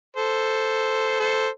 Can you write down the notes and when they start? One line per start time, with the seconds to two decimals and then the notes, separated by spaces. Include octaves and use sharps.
0.16 A4 C5
1.20 A4 C5